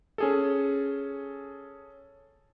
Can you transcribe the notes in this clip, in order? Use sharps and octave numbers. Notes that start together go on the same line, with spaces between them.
C#4 G#4 A4